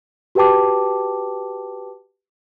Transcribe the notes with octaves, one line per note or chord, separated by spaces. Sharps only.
F#4 G4 B4 G5 A5 D6